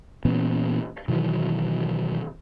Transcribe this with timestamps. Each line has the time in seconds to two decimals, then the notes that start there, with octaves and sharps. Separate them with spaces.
0.25 A#2 E3 B3 C#4
1.08 B2 D#3 E3 F#3